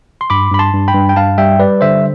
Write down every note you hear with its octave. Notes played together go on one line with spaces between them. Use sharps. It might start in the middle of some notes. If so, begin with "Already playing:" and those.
C6
G2 B5 D6
G2 B5
A5 C6
G2
G5 B5
G2
G5
G2 F5 A5
G3 E5 G5
G3 B4 D5
D3 C5 E5